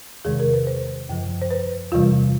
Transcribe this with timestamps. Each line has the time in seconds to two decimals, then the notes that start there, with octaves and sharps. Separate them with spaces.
0.25 E2 C3 D#3 G#3 G#4
0.40 A#4
0.54 B4
0.67 C5
1.09 F#2 C#3 F3
1.42 C5
1.51 B4
1.92 E2 C3 E3 G3 F4